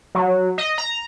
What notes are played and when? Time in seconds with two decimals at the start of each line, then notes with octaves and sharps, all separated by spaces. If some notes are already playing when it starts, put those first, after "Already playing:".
0.15 F#3
0.58 D#5
0.78 A#5